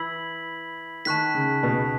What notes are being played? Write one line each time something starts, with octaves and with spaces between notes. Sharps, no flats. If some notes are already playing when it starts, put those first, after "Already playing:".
Already playing: E3 B5 E6 G#6 B6 F#7
D#3 A5 C#6 F#6 B6
C#3
B2